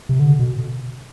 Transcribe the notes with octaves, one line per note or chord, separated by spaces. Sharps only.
C3
D3
B2